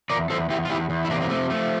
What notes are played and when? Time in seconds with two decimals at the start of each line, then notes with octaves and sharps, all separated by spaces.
0.10 E2 A#4 D5
0.30 E2 A4 C5
0.50 E2 E4 G4
0.65 F4
0.70 E2 E4 G4
0.90 E2
1.05 E4
1.10 C3 A#3 D4
1.21 A#3
1.30 F3 A3
1.50 F3 A3